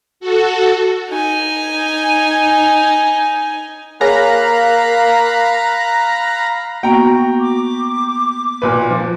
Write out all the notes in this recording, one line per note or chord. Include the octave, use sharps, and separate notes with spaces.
F#4 A4
D#4 G#5
A#3 G#4 C#5 F5 G#5 A#5 B5 F#6
A#3 B3 F#4 G5 A#5
D6
B1 A#2 B4
F3